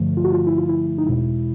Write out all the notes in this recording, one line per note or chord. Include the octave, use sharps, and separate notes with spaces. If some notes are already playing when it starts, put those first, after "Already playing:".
Already playing: G2 D3 F3 A3
F4
F#4
F4
E4
F4
E4
D#4
E2 B2 G#3 E4